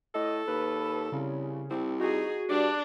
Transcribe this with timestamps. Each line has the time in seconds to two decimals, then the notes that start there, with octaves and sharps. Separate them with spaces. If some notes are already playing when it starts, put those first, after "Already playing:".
0.15 A2 A4 D#5
0.47 D#2 B4
1.12 C2 C#3
1.70 C2 C4
2.00 D#4 F#4 G#4
2.50 G2 D4 D5